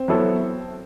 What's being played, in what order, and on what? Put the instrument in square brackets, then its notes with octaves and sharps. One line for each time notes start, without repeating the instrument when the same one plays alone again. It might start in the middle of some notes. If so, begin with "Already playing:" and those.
Already playing: [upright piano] C4
[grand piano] F#3 B3 E4 A4